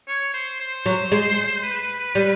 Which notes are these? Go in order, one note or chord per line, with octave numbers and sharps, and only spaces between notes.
C#5
C5
C5
F#3
G#3
B4
G3